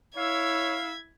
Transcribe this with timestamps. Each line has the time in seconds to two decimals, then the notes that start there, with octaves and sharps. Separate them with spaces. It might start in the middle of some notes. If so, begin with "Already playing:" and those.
0.17 E4 C#5 F5 E6 G#6 B6